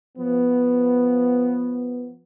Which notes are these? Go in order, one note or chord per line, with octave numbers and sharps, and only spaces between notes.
F3 B3